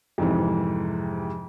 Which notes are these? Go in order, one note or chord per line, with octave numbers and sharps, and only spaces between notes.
F2 G#2 C3 E3